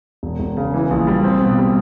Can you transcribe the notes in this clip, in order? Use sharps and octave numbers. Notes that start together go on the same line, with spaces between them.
E1
E1
C#3
E3
A#1
G3
C4
B2
G3